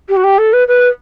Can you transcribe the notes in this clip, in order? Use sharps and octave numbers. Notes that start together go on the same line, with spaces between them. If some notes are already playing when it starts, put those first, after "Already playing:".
G4
F#4
G4
A4
B4
B4